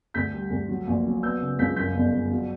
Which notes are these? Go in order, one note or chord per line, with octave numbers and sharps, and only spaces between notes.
D2 G6 B6
G3
D2
F#3
A#1
F#3
B3 E6 G6
C#3
C#2 G6 B6
F#2 G6 B6
G1
G1
F#3